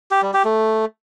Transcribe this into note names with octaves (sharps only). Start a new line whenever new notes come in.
G4
G3
G4
A3